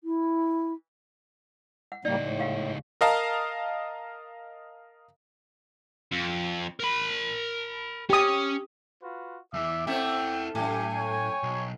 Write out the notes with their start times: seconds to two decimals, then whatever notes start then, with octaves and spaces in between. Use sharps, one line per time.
0.04 E4
1.92 F#5
2.05 C#2 A2 G3 A#3 D#4 D5
2.18 A2
2.39 G4 F5 F#5
3.01 A#4 D#5 F5 A5 A#5
6.11 F2
6.80 A#4 B5
8.10 C#4 G4 D#6
9.02 F4 F#4 B4
9.54 E2 E3 E5 D6
9.87 A3 C4 E4 E5 F#5 G5
10.55 F#2 A2 A3 G4 G5 G#5
10.96 C#5
11.43 B1